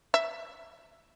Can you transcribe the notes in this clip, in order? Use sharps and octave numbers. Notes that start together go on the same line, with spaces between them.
E5